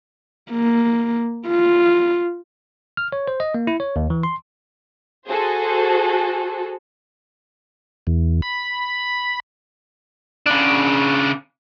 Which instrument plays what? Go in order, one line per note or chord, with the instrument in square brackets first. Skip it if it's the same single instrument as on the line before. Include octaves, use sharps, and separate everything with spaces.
[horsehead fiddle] A#3
F4
[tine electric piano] F6
C#5
C5
D#5
A#3
E4
C#5
D#2
E3
C6
[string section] F#4 G#4 A4 C5
[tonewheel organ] E2
B5
[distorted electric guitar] C#3 D4